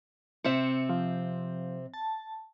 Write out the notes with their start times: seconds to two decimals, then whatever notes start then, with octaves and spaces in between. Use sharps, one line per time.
0.44 C3 C4 E5 C#7
0.89 F3
1.94 A5